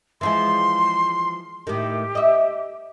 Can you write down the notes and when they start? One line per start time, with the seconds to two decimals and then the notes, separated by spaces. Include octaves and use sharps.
0.21 E3 F3 G#3 C6
1.67 A2 D#3 G4
2.15 D#5 E5